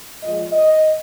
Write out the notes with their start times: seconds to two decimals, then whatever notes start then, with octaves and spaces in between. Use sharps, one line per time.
0.21 A#2 F3 G#3 D#5
0.51 D#5